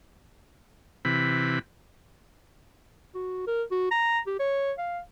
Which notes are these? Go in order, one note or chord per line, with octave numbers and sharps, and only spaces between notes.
C3 E3 B5
F#4
A#4
F#4
A#5
G4
C#5
F5